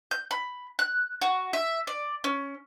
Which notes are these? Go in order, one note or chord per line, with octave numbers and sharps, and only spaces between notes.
G6
B5
F#6
F#4
E5
D5
C#4